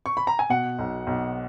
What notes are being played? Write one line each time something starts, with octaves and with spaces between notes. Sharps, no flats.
C#6
B5
A#5
G#5
B2 F#5
B1
B1